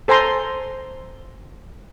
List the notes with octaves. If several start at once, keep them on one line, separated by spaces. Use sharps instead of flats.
A4 C5 G#5 A#5 C6